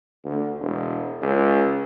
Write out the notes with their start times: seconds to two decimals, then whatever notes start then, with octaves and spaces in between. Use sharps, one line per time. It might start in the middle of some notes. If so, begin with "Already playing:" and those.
0.25 D2
0.60 E1
1.22 C#2